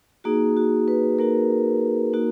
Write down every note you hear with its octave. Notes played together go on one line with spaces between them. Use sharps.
A#3 D#4 F#4 G#4
F#4
B4
A#3 D#4 F#4 A#4
A#3 D#4 F#4